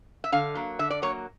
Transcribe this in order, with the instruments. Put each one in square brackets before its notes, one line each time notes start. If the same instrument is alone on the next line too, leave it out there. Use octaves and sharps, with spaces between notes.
[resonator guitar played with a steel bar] E5
D3 F5
F#3 A#3
D3 E5
D5
F#3 A#3 C#5